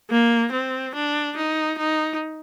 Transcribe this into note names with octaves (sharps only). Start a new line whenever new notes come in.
A#3
C4
D4
D#4
D#4